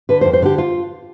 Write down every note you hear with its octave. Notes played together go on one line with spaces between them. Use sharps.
D3 B4
C5
F2
C5
D3 G4
F4